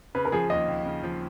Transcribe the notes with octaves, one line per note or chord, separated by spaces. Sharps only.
C#3 B4
A#4
F3 G#4
D#2 D#5
D#2
C#3
F3